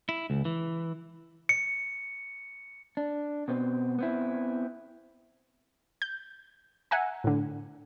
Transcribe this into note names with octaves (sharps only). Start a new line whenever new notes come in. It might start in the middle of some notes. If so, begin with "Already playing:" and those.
E4
C#2
E3
C#7
D4
B2 B3 C4
B3 C4 E4
G6
E5 F#5 G#5 A#5
A2 D3